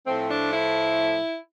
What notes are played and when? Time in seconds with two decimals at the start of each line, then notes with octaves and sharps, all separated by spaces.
0.05 A2 F3 A3 C4
0.28 D4
0.52 E4